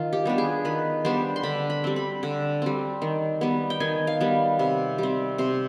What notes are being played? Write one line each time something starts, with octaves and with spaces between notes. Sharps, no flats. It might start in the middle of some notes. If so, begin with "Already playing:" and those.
Already playing: D#3 F4
G4
G3 B3 D4
G#4
D#3 B4
G3 B3 D4 C5
C6
D3 B5
B5
G3 C4
B5
D3
G3 C4
D#3
G3 B3
G5
D#3 G#5
F5
G3 B3
C3
G3 C4
C3 C5